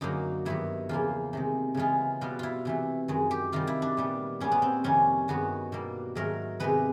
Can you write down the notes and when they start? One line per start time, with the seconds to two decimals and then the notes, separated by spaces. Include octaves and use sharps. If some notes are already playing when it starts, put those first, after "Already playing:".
0.01 F#2 D3 F#3 A#3 D#4
0.45 G2 D#3 F#3 B3 E4
0.89 E2 C#3 F3 A#3 F4
1.33 C3 D#3 G#3
1.74 C#3 E3 G#3 B3 F4
2.21 B2 G3 B3 F4
2.39 E4 F4
2.65 C3 E3 A3
3.08 F#2 D#3 G#3
3.31 G4
3.52 C3 D#3 G3 F4
3.67 E4
3.82 D4
3.97 A#2 G3 B3
4.40 A#2 G3 B3 C#4
4.52 B3
4.62 C4
4.84 F2 C3 D#3 G3 C#4
5.28 G2 D#3 G#3 B3 F#4
5.72 B2 G3 A#3
6.15 G#2 D#3 F#3 A3 A#4
6.60 C3 D#3 G#3 B3 B4